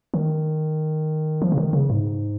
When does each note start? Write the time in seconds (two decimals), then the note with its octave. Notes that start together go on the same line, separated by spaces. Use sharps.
0.14 D#3
1.42 F3
1.52 C#3
1.58 D#3
1.73 C#3
1.90 G#2